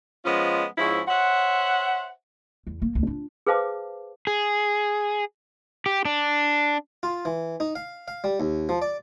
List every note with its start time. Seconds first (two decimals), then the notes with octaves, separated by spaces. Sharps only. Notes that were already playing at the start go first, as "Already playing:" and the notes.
0.24 F3 G#3 B3 C#4 F4 D#5
0.77 G#2 F3 C#4 E4
1.08 C5 C#5 E5 F#5
2.67 E2
2.82 A#3
2.95 D2
3.07 D4 F4
3.47 G#4 B4 C5 F5 A5 D6
4.27 G#4
5.86 G4
6.05 D4
7.03 F4
7.25 E3
7.60 D#4
7.75 F5
8.08 F5
8.24 G3
8.40 D#2
8.69 F3
8.82 D5